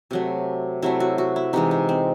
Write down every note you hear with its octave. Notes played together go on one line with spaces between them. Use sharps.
C3 F#3 A3
C3 F#3 A3 E4
F#4
F#4
E4
C3 E3 G#3 D#4
D#4
C4